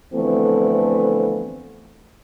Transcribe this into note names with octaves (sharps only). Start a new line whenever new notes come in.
D3 E3 F3 A3 B3 C4